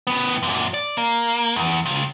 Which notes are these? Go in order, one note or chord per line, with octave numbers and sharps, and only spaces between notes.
A2 B3
F#2 A#2
D5
A#3
E2
C#2